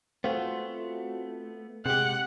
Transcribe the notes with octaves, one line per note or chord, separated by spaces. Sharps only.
A3 B3 C4 F4 F#4
C3 G#3 G4 F#5